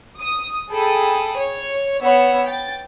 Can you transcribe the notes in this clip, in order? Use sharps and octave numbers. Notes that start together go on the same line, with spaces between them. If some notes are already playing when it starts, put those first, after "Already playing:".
D#6
G#4 A4 G5 B5 D#6
C#5
B3 C#5 F#5 B5 E6
G5 A6